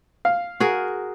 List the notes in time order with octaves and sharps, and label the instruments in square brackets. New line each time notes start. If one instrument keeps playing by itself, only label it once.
[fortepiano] F5
[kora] F#4 G#4 A#4